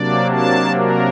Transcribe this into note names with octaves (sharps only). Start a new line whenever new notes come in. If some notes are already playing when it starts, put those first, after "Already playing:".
Already playing: C3 F#3 A#3 D4 D5
A5
A#4